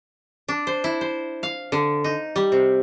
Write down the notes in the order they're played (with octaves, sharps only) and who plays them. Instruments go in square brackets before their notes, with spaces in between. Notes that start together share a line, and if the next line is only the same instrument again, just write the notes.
[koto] D4
C5
E4
C5
F5
D3
D#4
G3
C3